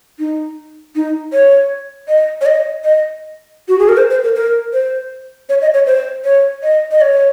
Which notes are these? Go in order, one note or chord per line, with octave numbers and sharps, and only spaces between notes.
D#4
D#4
C#5
D#5
C#5
D#5
D#5
F#4
G#4
A#4
C5
C5
A#4
A#4
C5
C#5
D#5
C#5
C5
C#5
D#5
D#5
C#5